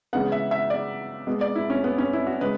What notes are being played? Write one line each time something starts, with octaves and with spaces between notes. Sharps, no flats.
C#3 E3 G#3 B3 F#5
E5
E5
D5
B2 G#3 B3
D5
E4
C#4
B3
C#4
E4
F#4
C#3 G#3 B4